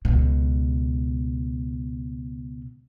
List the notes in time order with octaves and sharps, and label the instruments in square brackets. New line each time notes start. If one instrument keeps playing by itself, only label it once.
[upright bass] C#2 B2